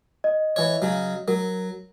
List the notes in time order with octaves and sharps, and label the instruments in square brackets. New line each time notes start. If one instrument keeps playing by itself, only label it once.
[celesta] D#5
[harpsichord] E3 C#5
C#3 F#3
[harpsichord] F#3 [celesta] A#4